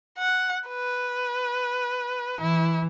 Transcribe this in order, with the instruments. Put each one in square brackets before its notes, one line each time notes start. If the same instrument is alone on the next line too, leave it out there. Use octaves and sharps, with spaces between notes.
[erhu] F#5
B4
[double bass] E3 [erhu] E4